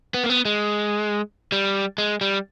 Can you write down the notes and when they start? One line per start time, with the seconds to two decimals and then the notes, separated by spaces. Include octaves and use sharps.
0.14 B3
0.24 A#3
0.30 B3
0.45 G#3
1.52 G3
1.98 G#3
2.21 G3